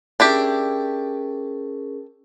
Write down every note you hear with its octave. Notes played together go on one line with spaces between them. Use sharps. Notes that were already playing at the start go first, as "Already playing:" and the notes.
C#4 D4 E4 G4 G#4 A#4